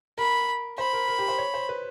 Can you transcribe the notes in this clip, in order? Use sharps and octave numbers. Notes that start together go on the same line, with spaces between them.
A#4 B5
C5 B5
A#4
A#4
G4
C5
C#5
C5
B4